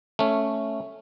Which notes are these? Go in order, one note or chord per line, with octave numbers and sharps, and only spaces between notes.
A3 C#4